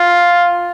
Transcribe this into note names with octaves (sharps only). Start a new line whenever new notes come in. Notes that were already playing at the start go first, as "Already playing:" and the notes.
Already playing: F4